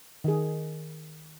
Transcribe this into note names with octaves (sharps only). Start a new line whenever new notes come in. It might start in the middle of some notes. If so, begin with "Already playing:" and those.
D#3 G#4